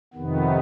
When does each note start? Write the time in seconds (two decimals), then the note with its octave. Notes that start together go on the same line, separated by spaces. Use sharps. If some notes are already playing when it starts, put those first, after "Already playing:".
0.14 F2 C3 D#3 B3